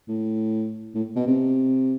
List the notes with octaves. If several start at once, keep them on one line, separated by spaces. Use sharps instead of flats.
A2
A2
B2
C3